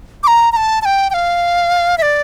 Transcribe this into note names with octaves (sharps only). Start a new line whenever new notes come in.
D6
A#5
A#5
A5
A5
G5
G5
F5
E5
D5